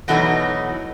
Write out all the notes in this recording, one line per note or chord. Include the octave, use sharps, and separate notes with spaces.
B2 E3 F#3 A3 D4 D#4